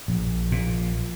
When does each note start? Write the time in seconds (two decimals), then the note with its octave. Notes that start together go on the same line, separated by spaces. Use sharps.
0.08 A#1
0.52 A#2